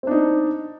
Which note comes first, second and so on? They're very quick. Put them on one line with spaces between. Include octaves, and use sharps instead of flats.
C4 D4 D#4